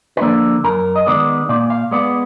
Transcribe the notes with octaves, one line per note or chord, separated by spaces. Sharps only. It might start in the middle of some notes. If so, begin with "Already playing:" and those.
B4
D3 F3 A#3 D5
F#2 A#4
D#5
D#3 G#3 B3 D5
A#2 D5
F5
G#3 B3 D5